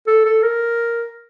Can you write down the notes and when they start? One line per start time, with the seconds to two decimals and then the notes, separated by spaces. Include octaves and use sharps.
0.07 A4
0.25 A4
0.43 A#4